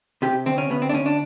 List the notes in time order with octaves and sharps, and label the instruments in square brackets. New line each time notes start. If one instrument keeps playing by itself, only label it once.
[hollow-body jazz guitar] C3 G4
D2 C4
C#4
D2 B3
C4
D4
D2 C#4
D4